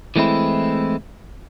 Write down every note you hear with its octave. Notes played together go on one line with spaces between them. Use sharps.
E3 G#3 A3 C4 E4